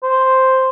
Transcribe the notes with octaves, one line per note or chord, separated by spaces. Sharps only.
C5